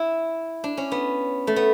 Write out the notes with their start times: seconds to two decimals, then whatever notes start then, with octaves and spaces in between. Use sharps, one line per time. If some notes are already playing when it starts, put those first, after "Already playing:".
Already playing: E4
0.64 D4
0.77 C#4
0.92 B3
1.47 A3
1.56 B3